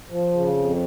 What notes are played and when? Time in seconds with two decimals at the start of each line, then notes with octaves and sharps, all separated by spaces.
0.10 F3
0.34 C#3
0.57 F2